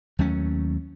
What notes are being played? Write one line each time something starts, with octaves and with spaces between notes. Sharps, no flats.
D#2 F#3 A3 C#4